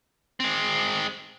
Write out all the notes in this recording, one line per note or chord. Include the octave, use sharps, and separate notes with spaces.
G#3 C4